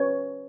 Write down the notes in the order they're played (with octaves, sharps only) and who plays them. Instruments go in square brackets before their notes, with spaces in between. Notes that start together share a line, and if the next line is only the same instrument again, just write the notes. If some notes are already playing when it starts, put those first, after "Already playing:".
Already playing: [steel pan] C#4 B4 C#5